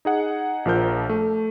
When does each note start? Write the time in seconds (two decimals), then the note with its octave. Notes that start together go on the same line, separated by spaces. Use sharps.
0.05 D#4 G#4 F#5
0.65 A#1 F3 A#4 G6
1.09 A3